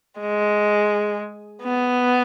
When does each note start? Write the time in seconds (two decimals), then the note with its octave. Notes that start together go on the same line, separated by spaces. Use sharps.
0.20 G#3
1.63 B3